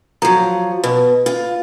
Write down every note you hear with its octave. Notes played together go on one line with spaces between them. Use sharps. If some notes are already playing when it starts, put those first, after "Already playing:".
F3 F#3 A#5
B2 B4
F4